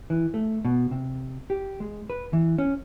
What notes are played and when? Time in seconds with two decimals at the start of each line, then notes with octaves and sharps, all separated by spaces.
0.10 E3
0.34 A3
0.65 B2
0.91 C3
1.50 G4
1.80 G#3
2.10 B4
2.33 E3
2.58 C#4